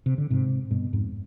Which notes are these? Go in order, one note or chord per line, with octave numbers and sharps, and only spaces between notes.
C3
D3
G#2 C3
G2 B2
F2 G#2